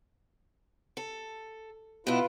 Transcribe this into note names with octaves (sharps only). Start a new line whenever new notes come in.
A4
B2 E4 F4 B4